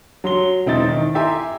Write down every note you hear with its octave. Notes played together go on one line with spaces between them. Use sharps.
F#3 C6 G7
E1 C4 D#4 E4 A6
D#3
E4 G4 E5 G#5 A#5 C6